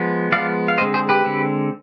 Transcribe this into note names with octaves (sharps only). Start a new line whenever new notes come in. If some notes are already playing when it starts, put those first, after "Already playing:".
Already playing: F3 G#3 B3
F3 G#3 B3 D5 F5
F5
D3 G#3 C4 C5 D#5
G#4 C5
G4 B4
D3 G#3 C4